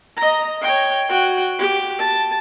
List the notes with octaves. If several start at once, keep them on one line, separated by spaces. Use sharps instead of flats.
D#5 A#5
C#5 G5
F#4 G5
G4
A5